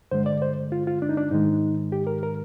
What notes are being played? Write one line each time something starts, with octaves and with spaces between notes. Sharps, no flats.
G2 D3 G#3 C5
D5
C5
F4
F4
D4
D#4
D4
G#2 D#3 G#3 D#4
G4
A#4
A#4